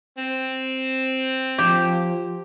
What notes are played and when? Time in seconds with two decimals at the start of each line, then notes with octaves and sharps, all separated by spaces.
0.18 C4
1.58 F3 G4